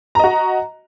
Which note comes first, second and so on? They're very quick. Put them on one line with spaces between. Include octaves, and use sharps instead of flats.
A#5 D#5 F#4